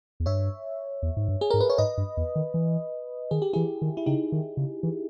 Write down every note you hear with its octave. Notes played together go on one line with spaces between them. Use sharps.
E2
G2 C#5 E5
E2
G#2
G2
G#4
G#2 A#4
B4
C#5
G#2 B4 D#5
G2
E2
D#3
E3
D#3 G#4
G4
E3 E4 G#4
D#3
E4
C#3 D#4 G4
D#3
C#3
E3